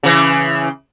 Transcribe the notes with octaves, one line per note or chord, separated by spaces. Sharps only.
C#3 E3